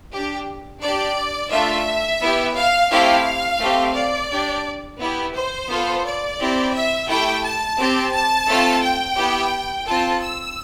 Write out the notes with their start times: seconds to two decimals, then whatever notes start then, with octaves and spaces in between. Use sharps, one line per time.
0.13 D4 G4
0.83 D4 G4 D5
1.52 A3 D4 F4 E5
2.22 B3 E4 G4
2.56 F5
2.91 A3 C4 E4 G4 F5
3.60 A3 C4 G4
3.95 D5
4.31 D4 G4
5.00 B3 E4 G4
5.34 C5
5.69 B3 F4 A4
6.05 D5
6.39 C4 E4 G4
6.73 E5
7.08 A3 E4 G4 G5
7.43 A5
7.78 C4 G4
8.12 A5
8.47 A3 C4 F4 A4
8.82 G5
9.17 B3 E4 G4
9.86 C4 F4 A4 A5
10.21 E6